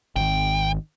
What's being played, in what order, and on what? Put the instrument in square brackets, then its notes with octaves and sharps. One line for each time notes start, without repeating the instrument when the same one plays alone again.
[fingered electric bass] G#1 D#3 [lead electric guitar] G5